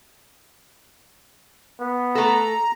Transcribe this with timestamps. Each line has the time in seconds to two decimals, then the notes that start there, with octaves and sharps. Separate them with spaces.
1.81 B3
2.15 A3 A4 A#5